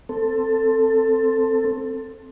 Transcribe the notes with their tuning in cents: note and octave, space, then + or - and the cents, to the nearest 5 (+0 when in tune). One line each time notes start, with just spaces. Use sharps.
C4 +0 A4 +15